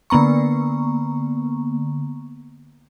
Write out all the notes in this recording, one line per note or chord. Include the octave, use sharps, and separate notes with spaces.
D3 A#3 B3 A#5 C#6